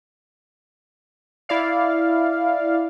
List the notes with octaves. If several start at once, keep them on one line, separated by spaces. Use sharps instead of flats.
E4 D5 F5